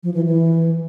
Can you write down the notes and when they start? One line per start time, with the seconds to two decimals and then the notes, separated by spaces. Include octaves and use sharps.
0.03 F3
0.14 E3
0.25 E3